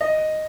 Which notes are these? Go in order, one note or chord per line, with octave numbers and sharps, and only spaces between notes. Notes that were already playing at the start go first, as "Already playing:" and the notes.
D#5